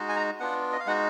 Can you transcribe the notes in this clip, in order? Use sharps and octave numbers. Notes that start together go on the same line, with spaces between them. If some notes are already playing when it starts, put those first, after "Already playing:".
Already playing: G#3 D#4 F#4
G#5
A#5
B3 D4 F4 F#5
D#5
F5
G#3 D#4 F#4 F#5